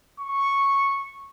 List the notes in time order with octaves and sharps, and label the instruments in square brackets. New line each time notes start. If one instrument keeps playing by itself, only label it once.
[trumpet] C#6